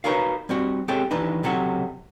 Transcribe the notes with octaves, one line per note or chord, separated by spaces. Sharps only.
D#4 F#4 A#4 B4 C#5 F5
G3 C4 F#4
G#3 C4 G4 A4 C#5 G5
D#2 E3 D4 D#4 B4
C#2 C3 F#3 A4 F#5